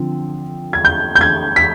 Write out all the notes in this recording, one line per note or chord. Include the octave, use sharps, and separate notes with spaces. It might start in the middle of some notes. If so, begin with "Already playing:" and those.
Already playing: D3 F3 C4
G#6
G6
G6
G#6
B6